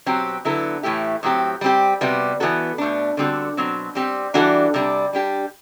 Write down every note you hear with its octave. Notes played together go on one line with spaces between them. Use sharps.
B2 F#3 C4 G4
D3 F#3 B3 E4 A4
A2 E3 A3 E4 G4
A2 F#3 C4 G4
G3 C4 G4
C3 G3 B3 F#4
E3 B3 F#4 A4
B2 A3 D4
D3 G3 C4 F#4 A4
B2 F#3 C4
G3 C4 G4
E3 G3 D4 F#4 A4
C3 G3 D4
G3 D4 G4